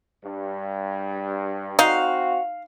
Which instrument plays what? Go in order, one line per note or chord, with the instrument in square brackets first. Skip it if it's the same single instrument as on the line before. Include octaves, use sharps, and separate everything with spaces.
[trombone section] G2
[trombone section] C4 F#4 [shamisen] D#4 [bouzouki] F5